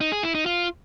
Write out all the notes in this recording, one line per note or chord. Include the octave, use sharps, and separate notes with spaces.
D#4
G#4
E4
D#4
F4